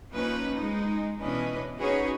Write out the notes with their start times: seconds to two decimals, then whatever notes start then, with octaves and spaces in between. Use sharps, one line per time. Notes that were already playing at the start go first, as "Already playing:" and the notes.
0.12 F3 A#3 C#4 D#4 B4
0.54 G#3 D#4
1.21 B2 E3 C#4 D4 B4 D#5
1.79 C#4 D#4 F#4 G#4 B4 C#5